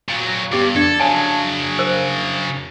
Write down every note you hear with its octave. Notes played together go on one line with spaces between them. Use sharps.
A#2 F#3
G2 B3 G4 D6
F2 D4 A4 G#6
C#3 F#3 C#5 G#5 A5
A#4 C5 E6